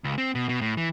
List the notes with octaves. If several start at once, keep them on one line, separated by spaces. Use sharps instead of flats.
C#2
C4
B2
B2
A2
E3